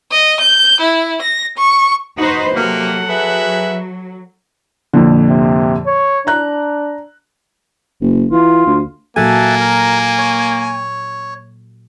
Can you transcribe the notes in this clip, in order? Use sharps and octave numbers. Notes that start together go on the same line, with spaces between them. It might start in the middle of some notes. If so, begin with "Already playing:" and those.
D#5
G6
E4
A#6
C#6
D#4 F#4 B4 C5
C3 F#3 A#3 A4 F#5
G#4 B4 E5
F2 A#2 D3
C3
C#5
D4 A#5 F#6
F#1
E3 F4
D2
A#2 F#3 A#3 A4 E5 F#5 G#5 A5
A#4
C#5